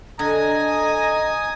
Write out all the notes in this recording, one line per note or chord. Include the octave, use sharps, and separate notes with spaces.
D3 D#5 G#5 A#5 D#6